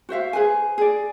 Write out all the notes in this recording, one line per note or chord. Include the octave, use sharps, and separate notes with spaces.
F#4 C5 E5 F5
G#4 B4 C5 G#5
G#4 D5